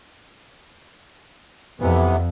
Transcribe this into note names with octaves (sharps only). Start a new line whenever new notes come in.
F2 C3 E3 B3